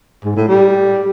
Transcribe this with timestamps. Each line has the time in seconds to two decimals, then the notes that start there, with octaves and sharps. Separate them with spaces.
0.25 G#2
0.36 A2
0.48 G3